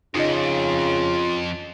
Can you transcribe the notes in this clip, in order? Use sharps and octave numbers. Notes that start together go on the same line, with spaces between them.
F2 C#3 D#4 F4 D#5